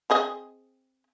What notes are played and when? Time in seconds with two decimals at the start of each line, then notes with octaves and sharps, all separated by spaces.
0.10 C4 G#4 D#5